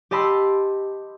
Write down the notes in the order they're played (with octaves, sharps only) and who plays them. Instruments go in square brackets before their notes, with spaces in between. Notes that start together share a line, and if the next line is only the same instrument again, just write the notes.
[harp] G4 D#5 A5 B5 C6 E6